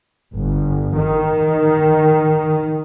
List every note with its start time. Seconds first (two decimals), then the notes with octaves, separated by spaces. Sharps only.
0.34 G1
0.96 D#3